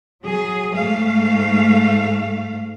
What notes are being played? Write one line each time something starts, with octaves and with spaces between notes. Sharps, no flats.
F#3 G#4
G#2 A3 F5